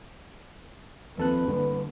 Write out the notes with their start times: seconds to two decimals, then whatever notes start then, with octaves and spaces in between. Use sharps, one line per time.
1.18 D#2 F3 C4 A4 B4 F#6
1.48 G2 D3 G3 A#3 B3